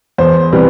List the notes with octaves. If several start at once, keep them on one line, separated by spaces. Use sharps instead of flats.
E2 C5
C3 E3 G3 B3